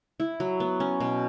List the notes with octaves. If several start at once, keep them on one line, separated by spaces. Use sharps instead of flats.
E4
F#3
B3
C#4
B2